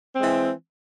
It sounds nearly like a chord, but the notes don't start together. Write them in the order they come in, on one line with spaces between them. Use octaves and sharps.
C4 G#3 E3